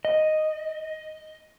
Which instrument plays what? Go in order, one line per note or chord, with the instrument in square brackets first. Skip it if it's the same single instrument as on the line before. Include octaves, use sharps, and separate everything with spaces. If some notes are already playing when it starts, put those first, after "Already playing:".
[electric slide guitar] D#5